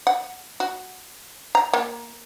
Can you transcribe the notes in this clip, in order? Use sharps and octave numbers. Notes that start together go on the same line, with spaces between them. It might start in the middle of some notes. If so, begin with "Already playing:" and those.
F#5
F#4
A#5
A#3